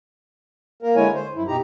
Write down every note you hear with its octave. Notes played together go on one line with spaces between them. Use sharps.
A#3 A#4
D3 G#3 E4 C#5 G#5
C5
F#2 E4
B2 D#4 G4 A#5